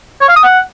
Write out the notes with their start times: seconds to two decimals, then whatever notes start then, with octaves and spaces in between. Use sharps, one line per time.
0.21 C#5
0.28 F5
0.36 D#6
0.43 F#5